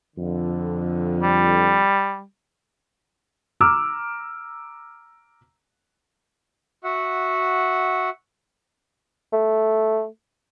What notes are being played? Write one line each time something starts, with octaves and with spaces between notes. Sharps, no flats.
F2 D3
G3
A#5 D6 E6 F6
F#4 E5 F#5
A3